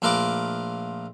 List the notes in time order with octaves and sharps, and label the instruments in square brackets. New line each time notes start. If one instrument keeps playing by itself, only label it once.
[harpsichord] A#1 A3 F4 A#4 B4 D6